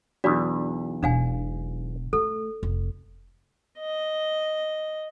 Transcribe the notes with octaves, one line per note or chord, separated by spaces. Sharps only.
B1 E2 D4 F#4 D5
E1 B2 D4 F5 G#5
A3 A4
F1
D#5